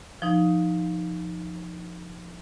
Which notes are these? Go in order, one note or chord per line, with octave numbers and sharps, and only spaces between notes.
F3 D#4